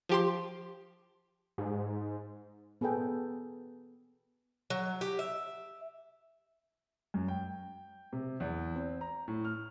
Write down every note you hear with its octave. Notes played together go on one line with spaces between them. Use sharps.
F3 G4 C6
G#2
B3 G#4 A4 B4 G5
F#3
G4
E5
F#2
G5
C3
E2
C4
A#5
A2
F6